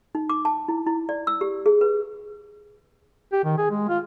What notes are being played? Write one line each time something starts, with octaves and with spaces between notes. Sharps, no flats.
D#4
D6
A5
E4
E4
D5
E6
G4
G#4
B4
G4
D#3
G#4
G#3
F4